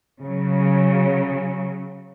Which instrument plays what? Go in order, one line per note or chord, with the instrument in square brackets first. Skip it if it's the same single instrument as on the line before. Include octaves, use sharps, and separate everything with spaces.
[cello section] C#3 F#3